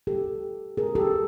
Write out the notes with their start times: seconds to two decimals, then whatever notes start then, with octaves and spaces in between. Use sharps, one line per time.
0.07 G4 A4
0.77 G#4 A#4
0.95 G4 A4